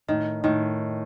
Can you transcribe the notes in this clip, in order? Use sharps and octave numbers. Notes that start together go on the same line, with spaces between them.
A2 D#3
A2 D#3